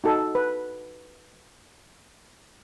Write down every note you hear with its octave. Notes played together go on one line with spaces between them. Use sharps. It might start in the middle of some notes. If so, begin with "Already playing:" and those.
D#4 F#4 A4
B4